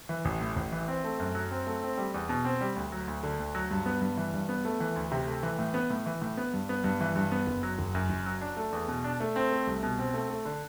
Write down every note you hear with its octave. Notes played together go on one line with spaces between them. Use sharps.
E3
A1
A2
A1
E3
C4
A3
F#2
F#3
C4
A3
C4
G3
E2
B2
C4
G3
D2
F#3
D2
D3
D2
F#3
G2
B3
G2
E3
G2
B3
A3
E3
D2
C3
A3
E3
A2
B3
A2
E3
A2
B3
G2
B3
G2
E3
G2
B3
F#1
F#3
F#1
F#2
F#1
F#3
D4
A3
E2
B2
D4
A3
C4
A3
C2
B2
C4
A3
A3
D3